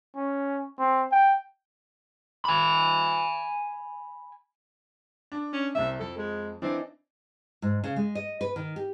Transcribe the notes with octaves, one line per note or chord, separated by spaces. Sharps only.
C#4
C4
G5
G#5 B5
D4
C#4
C2 C3 E5
F2 A4
G#3
E3 C4 D4 D#4
G#2
C#3
G#3
D#5
B4
D#3
G4